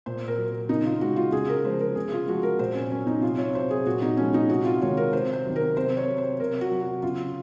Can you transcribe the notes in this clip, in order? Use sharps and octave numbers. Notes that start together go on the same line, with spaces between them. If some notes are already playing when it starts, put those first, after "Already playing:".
A#2 C5
A#4
F#3
C#3 D#4
F4
G#3 F#4
F4
C#3 G#4
A#4
F3 G#3 C5
A#4
C#3 G#4
F4
F3 G#3 F#4
A#4
A#2 C5
C#4
F#3 C#4
D#4
C3 F4
C#5
F#3 C5
G#4
A#2 F#4
D#4
F3 G#3 C#4
D#4
C3 F#4
F4
D#3 G#3 C#5
A#4
C3 C5
C5
D#3 F#3
A#4
C3 C5
C#5
F#3
C5
C3 A#4
F#4
F#3
F#4
C#3 F4